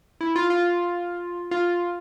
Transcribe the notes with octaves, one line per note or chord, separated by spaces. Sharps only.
E4
F4
F4
F4